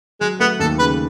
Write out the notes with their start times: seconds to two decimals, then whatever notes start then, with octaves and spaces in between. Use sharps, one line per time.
0.21 F#3 G#3
0.40 A3 B3
0.59 D#2 A4
0.79 C#3 B4